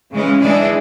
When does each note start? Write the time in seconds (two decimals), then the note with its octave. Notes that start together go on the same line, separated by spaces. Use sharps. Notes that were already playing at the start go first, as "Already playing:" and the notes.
0.13 C#3 E3 G#3 C#4
0.41 E3 G#3 D4 G#4